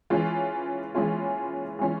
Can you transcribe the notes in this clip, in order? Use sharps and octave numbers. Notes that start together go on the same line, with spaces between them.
E3 G#3 C#4 F4
E3 G#3 C#4 F4
E3 G#3 C#4 F4